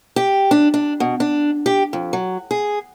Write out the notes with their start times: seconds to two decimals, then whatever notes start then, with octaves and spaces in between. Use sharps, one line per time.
0.16 G4
0.51 D4
0.74 D4
1.00 B2
1.20 D4
1.66 G4
1.93 F2
2.13 F#3
2.51 G#4